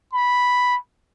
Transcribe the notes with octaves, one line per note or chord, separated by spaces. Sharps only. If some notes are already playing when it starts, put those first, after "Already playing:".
B5